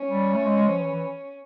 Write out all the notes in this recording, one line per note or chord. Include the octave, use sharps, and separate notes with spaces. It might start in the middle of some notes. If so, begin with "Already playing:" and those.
Already playing: C#4
G3
A3
G#3
G#3
F3
E3
E3